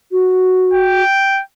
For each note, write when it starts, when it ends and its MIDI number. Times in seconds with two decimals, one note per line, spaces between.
0.12 1.02 66
0.74 1.42 79